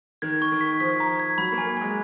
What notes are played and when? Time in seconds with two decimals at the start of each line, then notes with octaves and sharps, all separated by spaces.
0.22 D#3 G#6
0.42 C#6
0.52 D#3
0.61 B6
0.80 F3 B6
1.00 A#5
1.20 G#6
1.38 F#3 B5
1.52 A#3
1.58 G#5
1.67 A#3
1.77 G#3 G#5